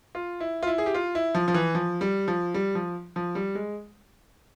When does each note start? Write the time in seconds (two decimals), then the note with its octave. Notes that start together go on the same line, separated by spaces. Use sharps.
0.15 F4
0.40 E4
0.62 F4
0.67 E4
0.78 G#4
0.86 G4
0.94 F4
1.15 E4
1.35 F3
1.48 F3
1.54 E3
1.75 F3
2.01 G3
2.28 F3
2.54 G3
2.75 F3
3.16 F3
3.35 G3
3.55 G#3